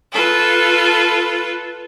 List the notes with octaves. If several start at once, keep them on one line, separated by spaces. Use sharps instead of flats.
F4 A4 B4